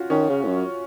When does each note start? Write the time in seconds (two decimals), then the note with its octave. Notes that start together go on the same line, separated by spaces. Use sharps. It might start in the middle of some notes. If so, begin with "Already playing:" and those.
Already playing: C#4 F4 F#4
0.10 D#3 C#4
0.29 C#3
0.43 A2
0.48 F#2